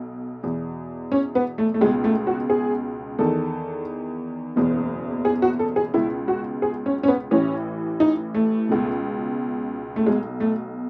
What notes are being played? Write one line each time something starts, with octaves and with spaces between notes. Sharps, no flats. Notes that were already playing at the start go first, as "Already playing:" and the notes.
Already playing: B1 B2
E2 B2
C#4
B3
A3
A3
C#2 B2 G#3
A3
F#4
G#4
E2 D#3 A4
F#1 E2 B2
G#4
F#4
A4
G#4
C#2 B2 E4
F#4
G#4
C#4
C#4
B3
A1 A2 E3 C#4
D#4
A3
C#2 B2
A3
B1 B2 G#3
A3